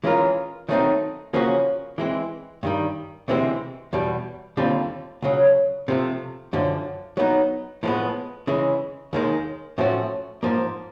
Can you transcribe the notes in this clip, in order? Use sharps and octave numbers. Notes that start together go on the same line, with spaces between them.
E3 G#3 C#4 F4 A#4
D#3 F#3 A3 C4 D#4
C#3 F3 A#3 C#4 F#4
E3 G#3 C4
G2 D#3 G3
D2 C3 E3 G#3 C4
E2 B2 G3
D#2 D3 G3 C4 F4
C#2 C#3 F#3
C3 F3 A3
F#2 D3 F3
F#3 B3 D#4
A2 F3 G#3 B3
C#3 E3 G#3
D#2 D#3 G#3
A2 F3 A3 C#4 F#4
G#2 F3 A#3